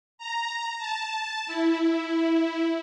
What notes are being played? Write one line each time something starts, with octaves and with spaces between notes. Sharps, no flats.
A#5
A5
E4